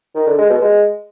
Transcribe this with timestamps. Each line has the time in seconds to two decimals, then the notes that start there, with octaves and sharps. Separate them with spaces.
0.15 D#3
0.27 D3
0.38 G#3
0.50 B2
0.61 G#3